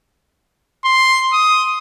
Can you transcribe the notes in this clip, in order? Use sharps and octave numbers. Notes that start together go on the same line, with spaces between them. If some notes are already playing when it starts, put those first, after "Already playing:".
C6
D#6